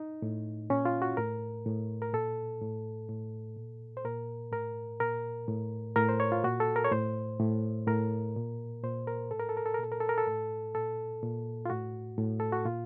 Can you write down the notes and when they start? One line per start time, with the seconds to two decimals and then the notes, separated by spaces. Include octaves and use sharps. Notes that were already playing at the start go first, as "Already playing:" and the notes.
Already playing: D#4
0.22 A2
0.70 A#2 C#4
0.85 F4
1.02 F#4
1.17 A2 A#4
1.66 A2
2.02 A#4
2.13 A#2 A4
2.61 A2
3.09 A2
3.57 A#2
3.97 C5
4.04 A#2 A#4
4.52 A2 A#4
5.00 A#2 A#4
5.48 A2
5.96 A2 A#4
6.09 C5
6.20 C#5
6.32 F4
6.44 A#2 F#4
6.60 A4
6.76 A#4
6.85 C#5
6.92 A2 C5
7.40 A2
7.87 A2 A#4
8.36 A#2
8.83 A#2 C5
9.07 A#4
9.31 A2 A4
9.40 A#4
9.49 A4
9.57 A#4
9.66 A4
9.74 A#4
9.79 A#2 A4
9.92 A#4
10.00 A4
10.09 A#4
10.18 A4
10.27 A2
10.75 A#2 A4
11.23 A#2
11.65 F4
11.70 A2 F#4
12.18 A2
12.40 A4
12.52 F#4
12.65 A#2 F4